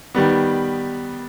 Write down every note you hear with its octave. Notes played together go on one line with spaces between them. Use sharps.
D#3 G3 B3